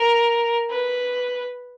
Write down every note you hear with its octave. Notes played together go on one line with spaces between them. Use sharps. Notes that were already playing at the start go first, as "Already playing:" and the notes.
Already playing: A#4
B4